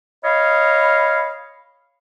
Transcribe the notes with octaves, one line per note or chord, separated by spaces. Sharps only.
C#5 D#5 F5 B5